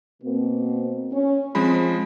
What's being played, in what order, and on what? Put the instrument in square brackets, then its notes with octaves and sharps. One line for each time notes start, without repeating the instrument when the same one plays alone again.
[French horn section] B2 A#3 C4
C#4
[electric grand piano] F3 G#3 B5 [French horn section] C4